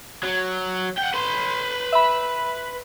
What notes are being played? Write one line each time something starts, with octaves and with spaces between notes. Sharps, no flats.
F#3
F#5 G5
B4 C6
E5 B5